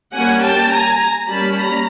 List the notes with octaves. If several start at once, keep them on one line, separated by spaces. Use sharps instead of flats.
G3 A#3 C#4 F#5 G#5
G5 A5
G#5 A#5
G3 A#3 C#4 A5 B5
A#5